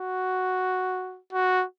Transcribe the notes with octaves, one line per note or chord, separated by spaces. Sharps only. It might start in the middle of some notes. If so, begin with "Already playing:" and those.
Already playing: F#4
F#4